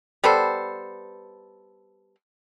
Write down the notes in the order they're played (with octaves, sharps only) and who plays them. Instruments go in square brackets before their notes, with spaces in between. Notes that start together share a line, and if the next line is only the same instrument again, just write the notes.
[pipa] G3 B3 A4 C5